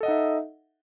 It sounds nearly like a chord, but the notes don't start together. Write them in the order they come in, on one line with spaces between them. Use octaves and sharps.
A4 D#5 F#5 D#4 E5